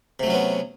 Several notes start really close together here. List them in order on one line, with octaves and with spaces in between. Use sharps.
C3 A3 F#3 C#4 B3